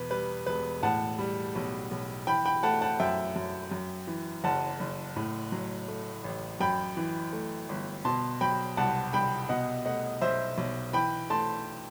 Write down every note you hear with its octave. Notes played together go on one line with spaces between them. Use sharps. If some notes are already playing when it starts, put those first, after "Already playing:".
Already playing: E2 B2 B4
G3 B4
E1 B4
A2 F#5 A5
G3
B1
B1
E3 G5 B5
G5 B5
A3 F#5 A5
F#5 A5
F#2 E5 G5
F#2
F#2
E3
F#1 F#5 A5
F#1
A2
F#3
A3
A1
F#2 G5 B5
E3
A3
G1
B2 A5 C6
F#3 G5 B5
C2 F#5 A5
C2 G5 B5
B2 D#5 F#5
A3 D#5 F#5
B1 C5 E5
B1
E3 G5 B5
A3 A5 C6